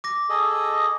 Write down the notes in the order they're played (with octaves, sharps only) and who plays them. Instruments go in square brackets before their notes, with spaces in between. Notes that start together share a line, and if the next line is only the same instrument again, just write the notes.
[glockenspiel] D6 A#6
[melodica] G#4 A4 D#5